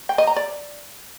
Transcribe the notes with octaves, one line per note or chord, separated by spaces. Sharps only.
G5
D#5
A#5
D5